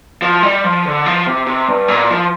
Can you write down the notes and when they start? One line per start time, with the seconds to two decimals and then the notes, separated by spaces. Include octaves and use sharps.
0.22 F3
0.43 G3
0.64 F3
0.85 D3
1.06 F3
1.27 C3
1.47 C3
1.68 G2
1.88 A#2
2.10 F3